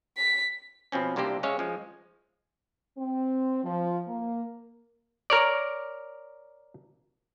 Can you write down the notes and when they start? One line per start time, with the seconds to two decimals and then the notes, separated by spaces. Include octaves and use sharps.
0.17 B6
0.92 B2 F3 C4 C#4
1.16 C2 C3 A#3 D4 G4 C5
1.43 G#3 C#4 C#5 E5 F5
1.59 F3 G#3
2.98 C4
3.64 F3
4.07 A#3
5.30 A#4 C#5 D5